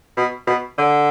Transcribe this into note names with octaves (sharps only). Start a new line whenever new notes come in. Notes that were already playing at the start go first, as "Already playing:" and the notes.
B2
B2
D3